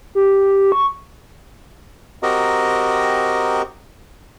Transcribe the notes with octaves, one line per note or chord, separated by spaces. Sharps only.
G4
C#6
C4 F#4 G4 A#4 D#5 A#5